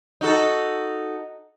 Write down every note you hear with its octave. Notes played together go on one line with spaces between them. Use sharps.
D#4 F#4 A4